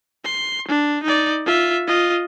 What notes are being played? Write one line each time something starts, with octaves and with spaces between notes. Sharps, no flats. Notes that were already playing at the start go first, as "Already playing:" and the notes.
C6
D4
D#4 D5
F4 E5
F4 D#5